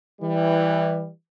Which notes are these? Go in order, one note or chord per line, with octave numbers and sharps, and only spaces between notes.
E3 G3